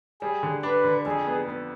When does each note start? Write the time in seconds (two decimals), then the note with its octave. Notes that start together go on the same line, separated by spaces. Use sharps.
0.22 G3 G#4
0.43 D3
0.63 D4 B4
0.84 D3
1.06 F2 G#4
1.27 B3
1.48 B3